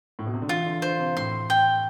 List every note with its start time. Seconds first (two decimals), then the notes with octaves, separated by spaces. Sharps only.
0.19 A2
0.27 B2
0.34 C3
0.41 D3
0.49 E3 F4
0.66 D3
0.82 D3 C5
0.99 C3
1.17 A2 C6
1.50 G5